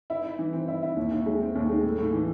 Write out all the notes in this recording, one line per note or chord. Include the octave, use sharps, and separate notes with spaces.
E4
E4
E3
C4
E4
E4
D#2
D#2
G#3
C4
D#2
G#3
A2
A2
E3